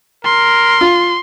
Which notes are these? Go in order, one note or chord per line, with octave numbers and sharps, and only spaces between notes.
A#4 C6
F4